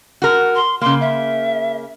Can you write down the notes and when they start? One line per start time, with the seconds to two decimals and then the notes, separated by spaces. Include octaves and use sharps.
0.22 F#4 A#4
0.56 C6
0.81 C#3 A#3 C6
1.01 E5